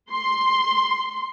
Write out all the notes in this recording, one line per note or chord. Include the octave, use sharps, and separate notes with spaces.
C6